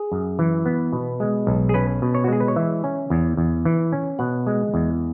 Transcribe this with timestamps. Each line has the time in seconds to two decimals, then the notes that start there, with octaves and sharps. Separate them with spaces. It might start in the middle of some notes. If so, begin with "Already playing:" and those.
Already playing: G#4
0.12 F#2
0.39 E3
0.66 B3
0.93 B2
1.20 G#3
1.47 B1
1.69 G#4
1.74 C#4 B4
2.02 B2
2.15 C#5
2.24 F#4
2.28 G#3 G#4
2.40 B4
2.48 C#5
2.56 E3 E5
2.84 C#4
3.10 E2
3.37 E2
3.65 E3
3.92 C#4
4.19 B2 F#5
4.47 G#3
4.74 E2